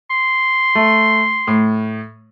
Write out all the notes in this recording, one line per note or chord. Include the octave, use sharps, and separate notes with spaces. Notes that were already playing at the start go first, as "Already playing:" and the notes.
C6
A3
A2